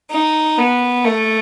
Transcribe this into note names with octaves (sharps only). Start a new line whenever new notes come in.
D#4
B3
A3